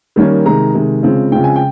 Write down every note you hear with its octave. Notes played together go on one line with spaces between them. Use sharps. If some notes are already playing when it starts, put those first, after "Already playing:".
D#3 G3 A#3 C#4
C3 D#3 G#3 A#5
C3 D#3 G#3
C#3 F3 G#3 C4
C#3 F3 G#3 C4 G5
G#5
G5